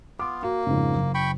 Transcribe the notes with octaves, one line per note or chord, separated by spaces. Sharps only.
B3 F4 D6
A#3 F#4
F2 G#2 C#3
F#1
G5 B5 C#6